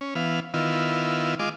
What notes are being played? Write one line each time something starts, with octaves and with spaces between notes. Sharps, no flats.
C#4
E3 B3 F5
D#3 B3 E4 F4
G#3 F4 D#5 D6